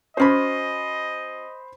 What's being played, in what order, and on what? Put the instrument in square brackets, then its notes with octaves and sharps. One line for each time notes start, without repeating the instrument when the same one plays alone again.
[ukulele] C#4 F#4 [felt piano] C5 B5 [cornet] D#5